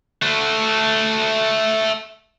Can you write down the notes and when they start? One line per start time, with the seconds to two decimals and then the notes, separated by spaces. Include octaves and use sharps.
0.22 A3 F#4